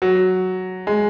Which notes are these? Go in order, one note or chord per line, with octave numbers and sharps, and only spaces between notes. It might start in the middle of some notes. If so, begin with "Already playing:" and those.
F#3
G#3